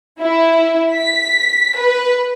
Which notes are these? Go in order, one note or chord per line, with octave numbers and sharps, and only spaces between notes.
E4
B6
B4